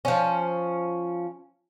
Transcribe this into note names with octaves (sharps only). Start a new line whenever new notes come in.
F3 C#4